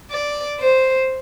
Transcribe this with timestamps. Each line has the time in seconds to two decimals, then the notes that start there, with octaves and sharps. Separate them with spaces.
0.11 D5
0.60 C5